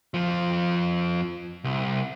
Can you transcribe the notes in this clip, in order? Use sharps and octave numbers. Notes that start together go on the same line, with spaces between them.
F2 F3
C2